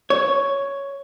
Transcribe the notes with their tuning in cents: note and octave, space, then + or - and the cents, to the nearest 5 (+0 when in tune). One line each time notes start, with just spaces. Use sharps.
C#5 +5